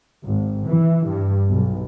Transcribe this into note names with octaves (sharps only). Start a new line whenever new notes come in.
G#1
E3
G2
B1